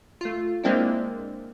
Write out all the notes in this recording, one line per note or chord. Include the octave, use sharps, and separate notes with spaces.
A3 F4
G#3 A#3 C4 D4 E4